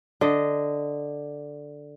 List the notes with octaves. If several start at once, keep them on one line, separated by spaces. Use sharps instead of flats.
D3 D#5